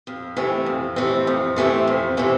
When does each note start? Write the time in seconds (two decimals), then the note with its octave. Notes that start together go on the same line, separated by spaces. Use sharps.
0.07 F2
0.37 C3 E3 A3 C4
0.66 F2
0.96 C3 E3 A3 C4
1.27 F2
1.56 C3 E3 A3 C4
1.88 F2
2.17 C3 E3 A3 C4